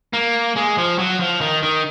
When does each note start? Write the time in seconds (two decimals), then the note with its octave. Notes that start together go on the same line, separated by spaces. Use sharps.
0.14 A#3
0.56 G#3
0.77 F3
0.98 F#3
1.20 F3
1.41 D#3
1.63 D#3